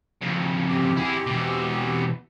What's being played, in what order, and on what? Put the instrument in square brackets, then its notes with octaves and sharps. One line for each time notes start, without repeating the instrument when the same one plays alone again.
[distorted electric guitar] F2 C#3
[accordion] C4 G4
[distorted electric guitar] E4 G#4
B2 E3